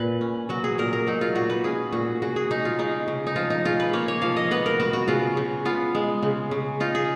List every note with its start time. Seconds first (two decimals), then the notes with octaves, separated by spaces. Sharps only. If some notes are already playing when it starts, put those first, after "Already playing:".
Already playing: A#2 B4
0.21 C#4
0.49 F#3 F#4
0.64 G#4
0.78 A#2 A#4
0.93 A#4
1.07 F#3 D#4
1.21 F4
1.35 A#2 F#4
1.50 B4
1.64 C#4 G#4
1.92 A#2 F#4
2.22 C#3 F#4
2.36 G#4
2.51 C#3 D#4
2.65 F4
2.79 C#3 D#4
3.08 C#3
3.27 D#4
3.36 F3 F4
3.50 D#4
3.65 C#3 F4
3.80 B4
3.93 A#3 C#5
4.08 C#5
4.22 F3 F5
4.36 D#5
4.51 B3 B4
4.66 A#4
4.80 B3 F#4
4.93 F#4
5.08 C#3 F4
5.37 C#3
5.65 B3 F4
5.95 G#3
6.23 C#3
6.51 C#3
6.80 D#4 F4
6.95 G#4